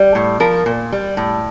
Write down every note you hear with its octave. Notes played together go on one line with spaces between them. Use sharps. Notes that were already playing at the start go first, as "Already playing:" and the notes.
Already playing: G3
A2
F3 A#4
A#2
G3
A2